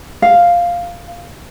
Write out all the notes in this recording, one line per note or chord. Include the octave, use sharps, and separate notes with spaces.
F5